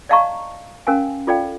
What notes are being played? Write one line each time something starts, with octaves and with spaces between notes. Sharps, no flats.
D5 D#5 F5 A5 A#5 C#6
C#4 A#4 F5 G#5
F4 A4 D5 F5 G5